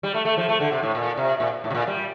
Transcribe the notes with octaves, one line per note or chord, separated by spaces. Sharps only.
G3
A3
A3
F3
A3
D3
C3
A2
A#2
C3
A#2
A2
C3
A#2
G3